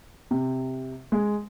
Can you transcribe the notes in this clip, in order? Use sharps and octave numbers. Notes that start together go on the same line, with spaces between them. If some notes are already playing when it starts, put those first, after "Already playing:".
C3
G#3